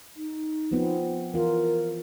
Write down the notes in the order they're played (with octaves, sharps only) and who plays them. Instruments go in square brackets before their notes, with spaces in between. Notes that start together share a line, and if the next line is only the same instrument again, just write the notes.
[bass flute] D#4
[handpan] F3 B3 C4
[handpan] E3 F4 [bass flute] A#4